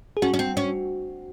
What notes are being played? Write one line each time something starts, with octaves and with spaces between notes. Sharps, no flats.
G#4
C#4 F#4
C#4
C4
C#4